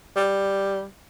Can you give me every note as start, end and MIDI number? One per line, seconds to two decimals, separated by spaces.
0.16 0.84 55